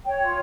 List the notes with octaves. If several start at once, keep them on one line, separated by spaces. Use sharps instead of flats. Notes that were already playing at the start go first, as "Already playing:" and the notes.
C#5 G5
F4